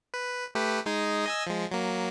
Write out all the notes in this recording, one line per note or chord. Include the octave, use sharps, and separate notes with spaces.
B4
A3 G4 B4
G#3 D#4 G#4
D#5 G#5 E6
F3 G#3
F#3 A#3